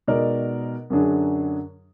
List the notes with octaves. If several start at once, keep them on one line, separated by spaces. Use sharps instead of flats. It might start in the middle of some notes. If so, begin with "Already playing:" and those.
B2 G#3 D#4 A#4 D5
F#2 D3 F#3 D4 G#4